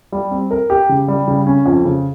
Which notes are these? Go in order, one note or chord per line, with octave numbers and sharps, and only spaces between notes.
G3
C4
A#4
G4
C#3
G3
C#3
C#4
F2
C#3